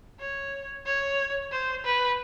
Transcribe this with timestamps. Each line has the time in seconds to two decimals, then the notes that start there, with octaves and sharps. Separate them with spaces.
0.20 C#5
0.85 C#5
1.51 C5
1.84 B4